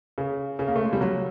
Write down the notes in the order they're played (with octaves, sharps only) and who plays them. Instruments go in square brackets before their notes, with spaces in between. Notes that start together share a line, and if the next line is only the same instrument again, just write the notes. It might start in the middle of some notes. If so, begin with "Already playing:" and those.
[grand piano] C#3
C#3
A#3
A3
G#3
G3
F#3